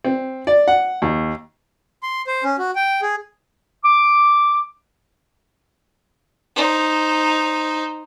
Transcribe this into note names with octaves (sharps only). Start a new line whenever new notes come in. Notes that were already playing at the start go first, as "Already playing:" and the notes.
C4
D5
F#5
D#2
C6
C5
C#4
F#4
G5
G#4
D6
D#4 C5